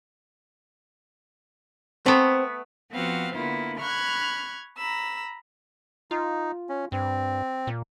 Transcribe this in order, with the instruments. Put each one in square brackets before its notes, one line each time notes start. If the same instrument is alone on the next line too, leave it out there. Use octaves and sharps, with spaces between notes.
[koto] A3 B3 [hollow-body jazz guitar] C4
[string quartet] F3 B3 C4 F#4 F5
D3 A#3 B3 E4 F4
B5 C#6 F6 F#6 G#6
A#5 B5 E6
[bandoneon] D#4 [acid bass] F4
[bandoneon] C#4
[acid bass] G2 [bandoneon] C4
[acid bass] A#2